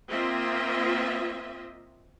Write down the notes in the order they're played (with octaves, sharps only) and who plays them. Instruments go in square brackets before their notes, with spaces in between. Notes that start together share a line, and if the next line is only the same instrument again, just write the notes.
[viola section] A#3 C4 F4 D#5 E5